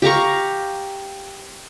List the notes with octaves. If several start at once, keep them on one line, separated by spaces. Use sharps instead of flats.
G4 F5 A#5 C#6